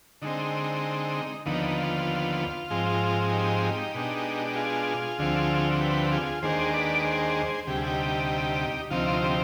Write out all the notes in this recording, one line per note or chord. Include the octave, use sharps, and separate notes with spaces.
D3 G#3 C4 D#4
D#2 D3 F3 B3 D#4
F4
G#2 F3 G#3 C4
D#4 G4
B2 G#3 D4
G4
F4 G#4
D2 D3 F3 C4
G4 B4
G4
F4 G#4
D#2 D#3 G#3 D4 G#4 C5
B4 D5
G#4 C5
D2 C3 G3 G4
G#4
D#4 G4
D2 C3 F3 C4 D#4 F4
F4
D#4 G4